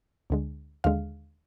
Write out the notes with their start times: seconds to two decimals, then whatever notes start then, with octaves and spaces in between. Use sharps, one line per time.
0.30 D2 D3 G#3
0.84 D#2 D3 G#3 F5